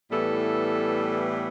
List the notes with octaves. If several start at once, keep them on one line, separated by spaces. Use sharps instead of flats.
A2 E3 G3 B3 A4